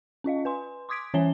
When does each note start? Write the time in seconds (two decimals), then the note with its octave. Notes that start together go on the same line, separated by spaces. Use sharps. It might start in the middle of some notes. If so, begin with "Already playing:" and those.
0.24 C#4 F4 D#5 F5
0.45 B4 G#5 C6
0.89 C6 D6 D#6 G#6 B6 D7
1.14 E3 C#4 C#5 E5 G#5 G7